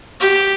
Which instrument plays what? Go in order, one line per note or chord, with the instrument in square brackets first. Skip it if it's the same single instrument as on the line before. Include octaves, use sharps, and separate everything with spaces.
[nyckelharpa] G4